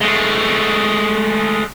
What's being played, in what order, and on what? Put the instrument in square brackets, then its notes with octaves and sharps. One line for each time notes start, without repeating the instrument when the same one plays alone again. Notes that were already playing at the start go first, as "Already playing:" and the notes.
[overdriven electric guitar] G#3 A3